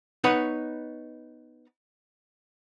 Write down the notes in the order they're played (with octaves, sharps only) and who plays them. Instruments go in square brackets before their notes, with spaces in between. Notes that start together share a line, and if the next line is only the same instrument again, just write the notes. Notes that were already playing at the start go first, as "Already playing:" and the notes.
[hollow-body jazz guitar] B3 D#4 B4 C#5 F#5